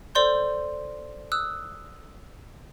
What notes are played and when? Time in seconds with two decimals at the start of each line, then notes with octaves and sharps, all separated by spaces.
0.15 A4 C5 D5 C6 G6
1.32 D#6 E6 F#6